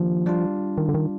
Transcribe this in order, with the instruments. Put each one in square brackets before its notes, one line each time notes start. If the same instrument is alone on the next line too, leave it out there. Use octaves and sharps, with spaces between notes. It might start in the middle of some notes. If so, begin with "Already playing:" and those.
Already playing: [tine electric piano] D#3 A#3 D4 G4 [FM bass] F3
[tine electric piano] G3 D4 F4
[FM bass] D#3
D3
D#3